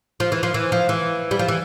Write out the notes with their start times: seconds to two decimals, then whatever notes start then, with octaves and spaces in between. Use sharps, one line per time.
0.20 F3
0.32 E3
0.43 F3
0.54 E3
0.72 F3
0.89 E3
1.31 G3
1.39 F3
1.48 E3